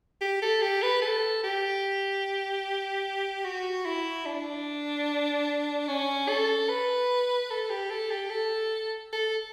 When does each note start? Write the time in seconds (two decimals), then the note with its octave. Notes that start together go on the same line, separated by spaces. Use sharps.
0.21 G4
0.42 A4
0.62 G4
0.83 B4
1.02 A4
1.43 G4
3.45 F#4
3.86 E4
4.26 D4
5.88 C#4
6.28 A4
6.69 B4
7.50 A4
7.70 G4
7.91 A4
8.11 G4
8.30 A4
9.13 A4